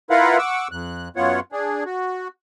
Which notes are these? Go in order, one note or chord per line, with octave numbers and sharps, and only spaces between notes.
E4 F4 A#4 B4 F5 F#5
F#5 C#6 D6 E6
F2 F#6
F#2 B3 F4 C#5 F#5
D4 G#4
F#4